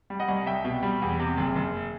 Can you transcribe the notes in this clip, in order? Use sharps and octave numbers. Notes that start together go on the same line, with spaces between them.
G3
D#5 F#5
C2
C2 E5 G5
B2
G3
E2
C3
F#1
F#1